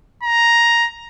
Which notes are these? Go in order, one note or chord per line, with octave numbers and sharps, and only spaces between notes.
A#5